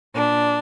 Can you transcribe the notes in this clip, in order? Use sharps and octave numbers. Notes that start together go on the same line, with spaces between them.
A#2 D4